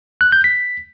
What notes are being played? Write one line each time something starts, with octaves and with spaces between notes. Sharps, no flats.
F#6
G6
B6